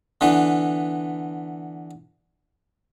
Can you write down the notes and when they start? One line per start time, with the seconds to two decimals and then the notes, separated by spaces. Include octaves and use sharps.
0.21 D3 E3 B3